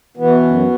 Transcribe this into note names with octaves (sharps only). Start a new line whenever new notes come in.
B2 E3 B3
F#2